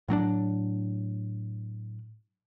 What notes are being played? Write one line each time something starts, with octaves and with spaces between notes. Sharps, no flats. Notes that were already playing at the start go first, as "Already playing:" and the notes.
A2 F#3 C4 D4